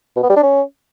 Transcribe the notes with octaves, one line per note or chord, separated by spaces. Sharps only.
B2
B3
G3
D4
C#4